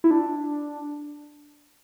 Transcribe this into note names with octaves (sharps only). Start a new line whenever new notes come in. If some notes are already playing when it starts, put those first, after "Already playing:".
E4
D4